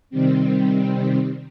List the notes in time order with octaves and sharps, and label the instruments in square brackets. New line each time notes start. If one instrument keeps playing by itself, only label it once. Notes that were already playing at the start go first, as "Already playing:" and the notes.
[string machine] C3 D#3 G3 C4